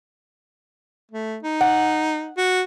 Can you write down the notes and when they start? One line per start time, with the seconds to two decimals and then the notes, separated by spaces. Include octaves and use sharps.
1.11 A3
1.43 D#4
1.61 F#5
2.37 F#4